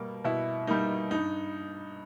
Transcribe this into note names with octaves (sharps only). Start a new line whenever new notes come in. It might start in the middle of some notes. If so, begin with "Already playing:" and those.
Already playing: B2 G3 A#3
B2 E4
G3 A#3 D#4
G2 D#4